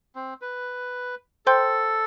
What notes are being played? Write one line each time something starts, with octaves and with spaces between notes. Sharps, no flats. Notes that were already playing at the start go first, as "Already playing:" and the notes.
C4
B4
A4 C5 G5 C6 G6